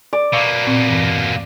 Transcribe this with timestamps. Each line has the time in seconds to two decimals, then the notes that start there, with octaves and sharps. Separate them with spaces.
0.13 D5 G#5
0.33 B2 A#3 F5 C#6 E6
0.67 A#2 C4
0.88 E2 G2 E3